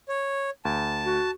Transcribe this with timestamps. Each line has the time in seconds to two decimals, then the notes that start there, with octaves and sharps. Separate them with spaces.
0.09 C#5
0.65 D2 A5
1.04 F#4